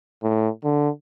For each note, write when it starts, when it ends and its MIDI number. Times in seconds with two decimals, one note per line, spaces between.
0.23 0.49 45
0.64 0.90 50